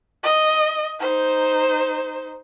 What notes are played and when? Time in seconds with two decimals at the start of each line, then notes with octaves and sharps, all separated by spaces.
0.23 D#5
1.00 D#4 C5